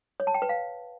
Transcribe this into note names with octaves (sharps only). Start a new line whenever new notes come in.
C#5
A5
G5
B4
F5